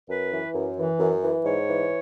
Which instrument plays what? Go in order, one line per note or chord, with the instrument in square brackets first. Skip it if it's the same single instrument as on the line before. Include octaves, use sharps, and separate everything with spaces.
[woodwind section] F#2 B4
E3
F#2
E3
F#2
E3
G#2 C#5
E3